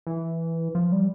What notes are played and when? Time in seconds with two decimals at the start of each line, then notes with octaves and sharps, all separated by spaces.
0.07 E3
0.75 F3
0.92 G3